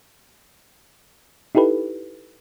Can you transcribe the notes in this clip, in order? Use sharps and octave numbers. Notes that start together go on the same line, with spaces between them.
D#4 E4 G4 A4 B4